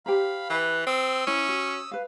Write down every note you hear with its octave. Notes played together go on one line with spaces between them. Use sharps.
G4 C5 F5 A#5 B5
E3 B4
C4 D#6 E6
C#4 E4
F#4
B4 F5